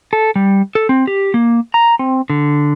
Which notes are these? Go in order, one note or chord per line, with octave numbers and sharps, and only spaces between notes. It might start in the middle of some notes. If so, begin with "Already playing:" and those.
A4
G3
A4
C4
G4
A#3
A#5
C4
D3